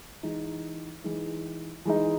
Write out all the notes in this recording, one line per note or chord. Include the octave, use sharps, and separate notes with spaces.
E3 G#3 D#4
E3 G#3 D#4
E3 G#3 D#4